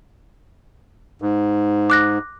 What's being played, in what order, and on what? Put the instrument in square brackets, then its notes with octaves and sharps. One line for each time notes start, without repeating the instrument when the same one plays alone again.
[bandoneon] G#2
[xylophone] D6 F#6 A#6